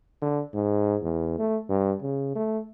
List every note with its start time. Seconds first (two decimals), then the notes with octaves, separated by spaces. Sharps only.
0.22 D3
0.54 G#2
1.03 E2
1.39 A3
1.69 G2
2.02 C#3
2.36 A3